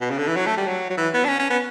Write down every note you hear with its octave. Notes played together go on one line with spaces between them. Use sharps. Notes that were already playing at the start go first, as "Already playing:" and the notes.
B2
C#3
D3
E3
F#3
A3
G3
F#3
F#3
E3
B3
D4
C#4
C#4
B3